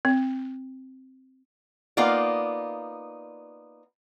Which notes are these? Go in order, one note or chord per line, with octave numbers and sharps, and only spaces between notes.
C4
A#3 B3 D#4 F4 D5